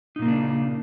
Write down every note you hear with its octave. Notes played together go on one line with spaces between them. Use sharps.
A#2 C#3 A#3 D4 D#4